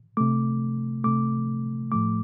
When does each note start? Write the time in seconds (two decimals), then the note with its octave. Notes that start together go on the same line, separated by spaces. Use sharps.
0.17 C3 A3 D6
1.04 C3 A3 D6
1.92 A2 F3 A3 D6